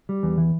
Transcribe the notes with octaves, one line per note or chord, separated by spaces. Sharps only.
G3
E2
E3